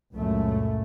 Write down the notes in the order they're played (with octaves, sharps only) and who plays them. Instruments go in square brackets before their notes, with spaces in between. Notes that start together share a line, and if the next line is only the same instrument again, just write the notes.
[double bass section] C#2 F#2 A#2 A3